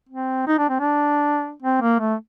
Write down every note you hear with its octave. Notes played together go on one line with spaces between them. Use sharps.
C4
D#4
D4
C4
D4
C4
A#3
A3